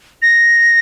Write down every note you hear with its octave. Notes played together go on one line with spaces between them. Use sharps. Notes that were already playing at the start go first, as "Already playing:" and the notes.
A#6